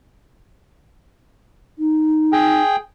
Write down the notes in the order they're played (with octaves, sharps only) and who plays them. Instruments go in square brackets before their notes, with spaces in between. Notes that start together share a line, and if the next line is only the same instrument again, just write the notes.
[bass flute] D#4
[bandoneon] G#4 G5